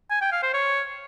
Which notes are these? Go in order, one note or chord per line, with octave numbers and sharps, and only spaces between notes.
G#5
G5
F5
C5
C#5